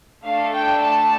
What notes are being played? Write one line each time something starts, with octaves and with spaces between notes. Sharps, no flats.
A3 D4 A4 F5
G5
A5